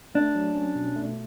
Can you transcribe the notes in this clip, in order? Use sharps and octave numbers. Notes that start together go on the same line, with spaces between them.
A3 D4
F#3
C#4
B2
A3